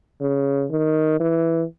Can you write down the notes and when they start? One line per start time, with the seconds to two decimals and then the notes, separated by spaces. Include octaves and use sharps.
0.21 C#3
0.71 D#3
1.20 E3